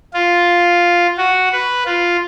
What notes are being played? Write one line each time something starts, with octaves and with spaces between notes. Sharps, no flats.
F4
F#4
B4
F4